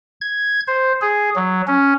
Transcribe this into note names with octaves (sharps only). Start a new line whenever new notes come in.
G#6
C5
G#4
F#3
C#4